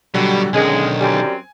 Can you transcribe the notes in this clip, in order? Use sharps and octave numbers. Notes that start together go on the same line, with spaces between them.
B2 D3 F#3 G3
B1 D3 D#3 G#3 C#4 G#5
F#2 G3 C4 G#5